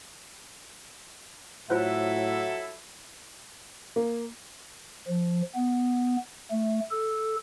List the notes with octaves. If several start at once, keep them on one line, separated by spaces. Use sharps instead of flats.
A2 F#3 E4 F4 A4 C5 C#5 E5
A#3
F3
B3
A3
A4